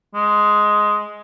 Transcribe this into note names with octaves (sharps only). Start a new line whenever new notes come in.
G#3